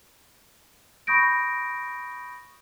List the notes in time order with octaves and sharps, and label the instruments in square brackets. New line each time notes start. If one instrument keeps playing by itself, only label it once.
[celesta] B5 C#6 D#6 G6 A#6 D7